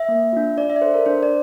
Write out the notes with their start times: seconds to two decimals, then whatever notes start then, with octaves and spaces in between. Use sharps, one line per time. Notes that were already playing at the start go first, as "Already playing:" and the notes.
Already playing: E5
0.09 A#3
0.33 D4 F4
0.57 D4 D5
0.70 E5
0.76 D5
0.81 A4 C5
0.94 A#4
1.06 D4 C5
1.23 D5